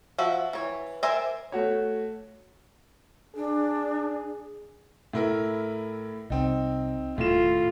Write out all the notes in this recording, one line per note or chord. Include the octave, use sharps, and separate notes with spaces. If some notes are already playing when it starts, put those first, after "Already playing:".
F3 F#4 E5
E3 C#5
A#4 C5 D5 E5 G#5
A3 F#4 C#5
D4 G#4
A2 E4 A#4
C2 C4 D#4
D#1 A2 F4 E7